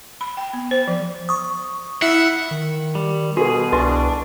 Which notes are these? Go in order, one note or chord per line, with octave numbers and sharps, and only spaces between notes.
B5
G5
B3
C5
F3
C#6 D#6
E4 E5 F#5
D#3
G3
B2 F#4 G#4 A4
C2 D4 B4 E5 C6